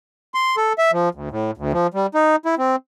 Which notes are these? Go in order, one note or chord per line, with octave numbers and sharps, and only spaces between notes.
C6
A4
E5
F3
D2
A2
D2
F3
G3
D#4
E4
C4